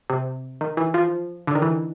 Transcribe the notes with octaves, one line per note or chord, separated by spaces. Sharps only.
C3
D#3
E3
F3
D3
D#3
E3